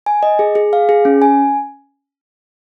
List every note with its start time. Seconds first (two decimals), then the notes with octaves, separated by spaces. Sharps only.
0.06 G#5
0.23 D#5
0.39 G#4
0.55 G#4
0.73 F5
0.89 G#4
1.05 C#4
1.22 G#5